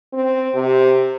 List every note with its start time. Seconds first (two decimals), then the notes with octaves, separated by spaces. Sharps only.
0.13 C4
0.54 C3